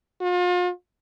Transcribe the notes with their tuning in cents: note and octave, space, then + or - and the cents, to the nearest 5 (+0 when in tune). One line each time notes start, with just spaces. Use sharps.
F4 +40